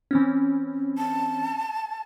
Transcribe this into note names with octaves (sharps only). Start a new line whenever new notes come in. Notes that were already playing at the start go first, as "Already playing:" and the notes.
E3 C4 C#4
A5